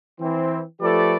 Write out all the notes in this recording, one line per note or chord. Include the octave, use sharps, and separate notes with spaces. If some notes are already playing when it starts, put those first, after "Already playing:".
E3 C4
F3 A3 G4 A4 B4 D5